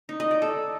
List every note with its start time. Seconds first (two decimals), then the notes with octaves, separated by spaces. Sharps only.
0.09 D#4
0.20 D#5
0.31 D5
0.42 A4